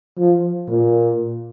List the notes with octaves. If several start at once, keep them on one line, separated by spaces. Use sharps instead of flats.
F3
A#2